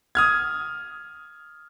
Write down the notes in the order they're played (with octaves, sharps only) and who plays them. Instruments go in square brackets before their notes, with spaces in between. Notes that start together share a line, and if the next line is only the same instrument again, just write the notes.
[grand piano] D#6 F6 G#6